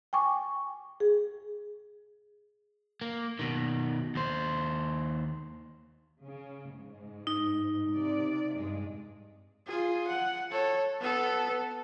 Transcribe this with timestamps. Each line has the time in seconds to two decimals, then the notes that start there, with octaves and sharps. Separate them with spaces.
0.13 G5 G#5 C#6 D6
1.00 G#4
3.01 A#3
3.39 B2 D#3
4.15 D#2 C5
6.22 C#3
6.76 G#2
7.27 D#4
7.93 C3 D5
8.54 G2 G#3
9.67 F4 G#4
10.08 F#5
10.51 A4 C#5
11.00 B3 A4